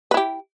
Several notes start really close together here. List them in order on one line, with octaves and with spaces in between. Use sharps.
B4 E4 G4